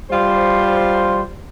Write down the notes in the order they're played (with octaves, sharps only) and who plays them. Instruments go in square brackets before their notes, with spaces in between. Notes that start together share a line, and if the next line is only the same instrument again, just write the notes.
[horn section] G3 F4 C5